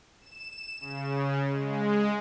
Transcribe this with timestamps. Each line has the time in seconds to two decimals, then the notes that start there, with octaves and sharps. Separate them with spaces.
0.19 E7
0.80 C#3
1.50 G#3